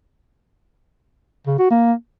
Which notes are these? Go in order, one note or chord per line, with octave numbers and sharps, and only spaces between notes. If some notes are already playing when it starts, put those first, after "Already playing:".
C#3
F#4
A#3